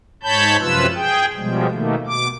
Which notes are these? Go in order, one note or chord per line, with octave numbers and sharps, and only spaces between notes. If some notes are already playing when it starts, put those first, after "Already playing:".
G#2 C#5 A5 B5 G6
F#2 C3 F3 F4 B4 E6
G#4 G5
B2 F3 G3 G#3
B2 D#3 A3 A#3
B2 D6